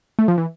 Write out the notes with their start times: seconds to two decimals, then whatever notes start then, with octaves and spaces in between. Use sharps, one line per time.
0.19 A3
0.28 F3
0.38 E3